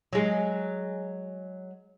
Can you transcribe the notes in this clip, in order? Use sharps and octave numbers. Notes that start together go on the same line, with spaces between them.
F#3 G#3